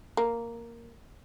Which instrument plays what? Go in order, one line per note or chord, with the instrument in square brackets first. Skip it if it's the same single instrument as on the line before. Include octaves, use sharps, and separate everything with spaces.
[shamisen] A#3